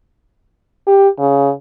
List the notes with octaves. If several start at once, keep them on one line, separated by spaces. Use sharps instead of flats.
G4
C#3